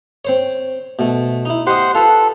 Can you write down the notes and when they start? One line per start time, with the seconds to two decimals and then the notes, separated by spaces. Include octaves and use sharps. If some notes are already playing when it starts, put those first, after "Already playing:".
0.25 C4 C5 C#5
0.99 B2 A3
1.45 D#4 E4
1.67 G4 C5 D#5 F#5 C6
1.95 F4 A4 B4